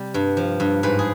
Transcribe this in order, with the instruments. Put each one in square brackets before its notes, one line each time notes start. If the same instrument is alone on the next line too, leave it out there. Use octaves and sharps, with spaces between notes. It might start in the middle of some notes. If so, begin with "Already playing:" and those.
Already playing: [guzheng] C3 G3 G4
G2
F3
G2
G#2 B4
G#4